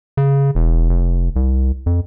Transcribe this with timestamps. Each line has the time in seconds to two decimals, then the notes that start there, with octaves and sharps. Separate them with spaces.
0.17 C#3
0.55 E1
0.89 F1
1.36 C2
1.86 F2